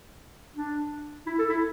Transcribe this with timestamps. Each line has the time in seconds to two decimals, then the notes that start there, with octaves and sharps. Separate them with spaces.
0.56 D4
1.27 E4
1.39 A4
1.49 E4